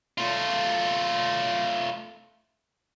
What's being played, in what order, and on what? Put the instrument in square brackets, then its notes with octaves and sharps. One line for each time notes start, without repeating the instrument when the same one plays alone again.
[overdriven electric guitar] A3 F4